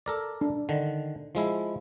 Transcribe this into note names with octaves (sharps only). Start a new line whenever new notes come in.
A4 A#4 D5
D4
D3 D#3
F3 G#3 E4